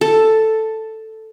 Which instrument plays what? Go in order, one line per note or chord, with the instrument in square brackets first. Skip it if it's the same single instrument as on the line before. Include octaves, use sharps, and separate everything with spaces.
[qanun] A4